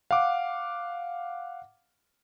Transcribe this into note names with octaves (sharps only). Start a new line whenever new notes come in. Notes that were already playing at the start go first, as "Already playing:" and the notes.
F5 F#5 D6